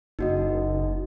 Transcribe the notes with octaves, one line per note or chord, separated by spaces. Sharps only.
F#1 D#4 F#4 D#5